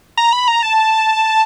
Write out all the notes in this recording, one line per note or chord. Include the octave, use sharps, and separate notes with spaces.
A#5
B5
A#5
A5